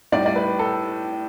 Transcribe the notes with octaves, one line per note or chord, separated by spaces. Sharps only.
A2 G3 D5
D5
B4
A4